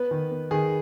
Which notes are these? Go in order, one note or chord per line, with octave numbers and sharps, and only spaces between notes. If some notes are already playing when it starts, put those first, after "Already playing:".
Already playing: B3 B4
D#3
B3
D#3 G#4